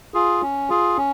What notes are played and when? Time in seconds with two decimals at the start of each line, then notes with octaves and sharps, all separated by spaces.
0.14 F4 G#4
0.42 C#4
0.70 F4 G#4
0.97 C#4